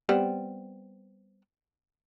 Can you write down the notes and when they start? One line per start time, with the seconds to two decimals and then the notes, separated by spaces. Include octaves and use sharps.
0.09 G3 B3 C4